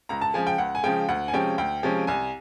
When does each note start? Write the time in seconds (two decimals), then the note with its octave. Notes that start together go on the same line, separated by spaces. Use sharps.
0.09 C#2 A#5
0.21 A5
0.34 C#3 F3 G#3 G#5
0.47 G5
0.58 C#2 F#5
0.75 G#5
0.84 C#3 F3 G#3 G5
1.09 D2 F#5
1.28 G#5
1.33 C3 F3 G#3 C#4 G5
1.58 D2 G5
1.83 C3 F3 G#3 C#4
2.07 C2 G#5